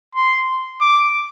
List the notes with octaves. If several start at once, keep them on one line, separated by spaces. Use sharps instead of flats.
C6
D6